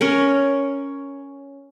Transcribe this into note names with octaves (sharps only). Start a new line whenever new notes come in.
C#4 A#4 C#5